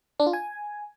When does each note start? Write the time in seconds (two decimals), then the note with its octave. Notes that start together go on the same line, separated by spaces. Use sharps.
0.20 D4
0.26 F4
0.33 G#5